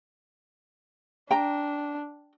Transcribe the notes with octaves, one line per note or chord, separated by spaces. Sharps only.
D4 G5 A#5